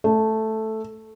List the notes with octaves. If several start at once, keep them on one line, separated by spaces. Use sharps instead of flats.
A3